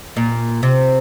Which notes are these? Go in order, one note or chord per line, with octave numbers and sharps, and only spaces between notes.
A#2
C3